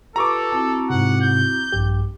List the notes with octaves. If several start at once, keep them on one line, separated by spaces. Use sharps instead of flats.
F4 G4 A4 B4 A#5 C#6 D6
C4 E4 F#4 A5
G#2 C3 F#5
G6
A#1 G2 G4